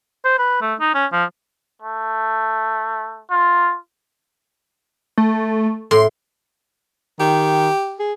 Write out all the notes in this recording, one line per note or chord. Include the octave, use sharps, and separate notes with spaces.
C5
B4
A3
D#4
C#4
F3
A3
F4
A3
A2 C6
D#3 G4
G#4